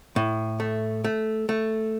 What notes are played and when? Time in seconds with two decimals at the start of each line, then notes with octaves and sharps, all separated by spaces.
0.16 A2
0.60 A3
1.04 A3
1.49 A3